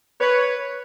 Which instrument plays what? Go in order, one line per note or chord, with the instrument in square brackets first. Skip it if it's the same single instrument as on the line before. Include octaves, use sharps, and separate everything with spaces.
[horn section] B4 C#5